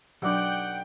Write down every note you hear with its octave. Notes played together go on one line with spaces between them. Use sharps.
B1 F#3 D4 D5 F#5 G5